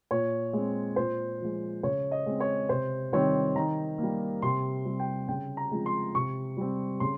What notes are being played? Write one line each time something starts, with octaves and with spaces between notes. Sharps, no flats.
A#2 C#5
G#3 C4
A#2 C5
F3 G#3
C#3 C#5
D#5
G#3 C4
C#5
C3 C5
D#3 G3 C4 C#5
D#3 A#5
G3 A#3
C3 C6
G3 C4
G5
C#3 G5
A#5
F3 G#3 C4
C6
C3 C#6
G3 C4
C#3 C6